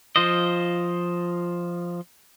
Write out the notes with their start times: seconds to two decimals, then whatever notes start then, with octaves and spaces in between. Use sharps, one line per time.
0.16 F3 F4 C5 D#5